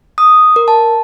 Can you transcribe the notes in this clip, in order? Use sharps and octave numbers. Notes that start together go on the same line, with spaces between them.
D#6
A#4
A5